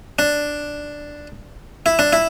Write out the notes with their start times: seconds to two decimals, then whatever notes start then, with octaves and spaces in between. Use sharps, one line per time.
0.19 D4
1.86 E4
1.99 D4
2.13 E4